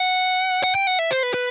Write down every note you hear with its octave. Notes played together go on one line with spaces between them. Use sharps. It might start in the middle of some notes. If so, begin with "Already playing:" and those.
Already playing: F#5
F#5
G5
F#5
E5
C5
B4
B4